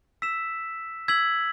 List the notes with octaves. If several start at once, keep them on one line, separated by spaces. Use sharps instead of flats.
E6 B6 E7
E6 G#6 B6 F#7